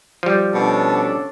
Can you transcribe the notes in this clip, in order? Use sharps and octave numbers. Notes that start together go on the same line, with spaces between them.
F3 G3
B2 C#4 D4 A4